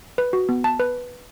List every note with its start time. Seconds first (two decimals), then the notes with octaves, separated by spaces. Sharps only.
0.18 B4
0.33 F#4
0.49 B3
0.64 A5
0.80 B4